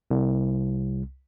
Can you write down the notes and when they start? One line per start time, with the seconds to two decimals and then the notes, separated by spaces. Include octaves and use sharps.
0.11 C2